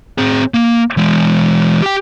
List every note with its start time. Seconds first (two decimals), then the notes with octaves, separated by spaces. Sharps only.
0.18 C4 G#4
0.54 A#3
0.97 E3 G#3
1.82 G4 G5